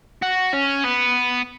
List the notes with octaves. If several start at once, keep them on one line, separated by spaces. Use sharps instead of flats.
F#4
C#4
B3